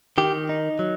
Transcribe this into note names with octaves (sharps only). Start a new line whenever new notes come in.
D#3 G4
D#4
F#3